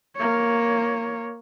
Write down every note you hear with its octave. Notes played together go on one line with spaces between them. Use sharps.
A#3 C#5